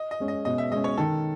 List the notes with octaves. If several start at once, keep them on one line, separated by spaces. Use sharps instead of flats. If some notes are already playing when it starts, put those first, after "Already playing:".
Already playing: D#5
D#5
G#3 C#4
D#5
B2 D#5
E5
G#3 C#4 D#5
C#5
D#3 A4